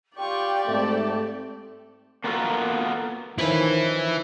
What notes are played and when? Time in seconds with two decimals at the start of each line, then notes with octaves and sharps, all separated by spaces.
0.18 F4 G4 D5 G5 C#6
0.67 G#2 A3 C4 A4 E5
2.24 A#3 B3 F4 F#4 A4 A#4
3.38 D#3 F3 C#4 E4 B4